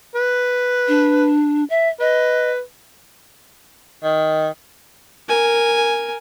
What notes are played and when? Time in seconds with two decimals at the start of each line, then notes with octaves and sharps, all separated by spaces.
0.16 B4
0.88 D4
1.70 E5
2.00 B4 D#5
4.03 D#3
5.29 A#4 G#5